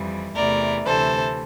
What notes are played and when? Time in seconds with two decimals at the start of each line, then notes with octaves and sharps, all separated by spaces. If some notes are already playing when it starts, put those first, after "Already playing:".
Already playing: F2 E3 G3
0.35 E2 C3 E3 A3 A#4 D5
0.86 D2 C3 E3 A4 C5